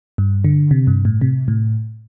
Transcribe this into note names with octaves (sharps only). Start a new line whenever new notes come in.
G2
D3
C3
G2
A2
C3
A2